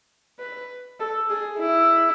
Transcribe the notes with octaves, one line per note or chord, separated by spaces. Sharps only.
B4
A4
G#4
E4